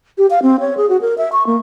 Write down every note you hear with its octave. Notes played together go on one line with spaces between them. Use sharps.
G4
F5
C4
C#5
G#4
F#4
A#4
E5
C#6
A#3